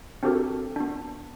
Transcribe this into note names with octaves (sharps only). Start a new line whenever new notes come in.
C4 D4 F#4 G4 A4 A#4
B3 D4